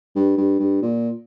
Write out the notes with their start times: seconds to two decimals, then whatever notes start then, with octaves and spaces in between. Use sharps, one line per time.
0.15 G2
0.37 G2
0.59 G2
0.82 A#2